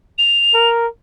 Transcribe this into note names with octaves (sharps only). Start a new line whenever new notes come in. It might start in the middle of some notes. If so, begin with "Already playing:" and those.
F7
A#4